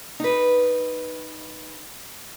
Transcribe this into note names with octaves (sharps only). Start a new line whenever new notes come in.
D#4 B4